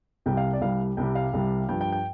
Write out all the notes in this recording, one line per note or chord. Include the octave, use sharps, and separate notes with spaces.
C2 C3 G3 G5
F5
D5
C2 C3 G3 F5
C2 C3 G3 G5
F5
C2 C3 G3
G2 F3 G5
G5
G5